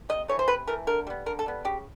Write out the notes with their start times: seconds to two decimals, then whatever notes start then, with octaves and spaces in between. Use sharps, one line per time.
0.09 C3 D#5
0.28 E3 A3 C#5
0.39 C5
0.48 C3 B4
0.67 E3 A3 A#4
0.87 D3 A#4
1.07 G3 B3
1.26 D3 A#4
1.39 A4
1.46 G3 B3
1.65 C#3 G4